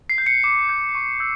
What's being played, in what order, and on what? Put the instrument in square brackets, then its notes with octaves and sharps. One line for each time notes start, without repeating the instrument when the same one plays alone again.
[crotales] C7
G6
C#7
D6 C#7
G6
C#6
E6 G6